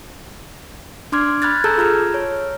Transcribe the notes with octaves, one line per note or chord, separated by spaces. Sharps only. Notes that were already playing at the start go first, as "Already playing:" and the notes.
D4 C6 D6 F6 G#6
B5 F6 F#6 G#6 A6
G#4 A4 A5 A#5 E6 G6
F4 A#5 F6 G#6
C#5